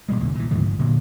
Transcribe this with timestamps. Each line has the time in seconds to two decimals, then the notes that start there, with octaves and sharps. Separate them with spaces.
0.09 A#2 G3 G#3
0.21 B1 E2 D3
0.35 A#2 E3
0.51 D2 G#2 C#3 F3
0.66 G1
0.79 A#2 D3 F#3